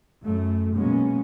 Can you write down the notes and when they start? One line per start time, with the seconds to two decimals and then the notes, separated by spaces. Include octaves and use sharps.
0.23 F#2 A3
0.76 B2 F#3 G#3 A#3 B3 C#4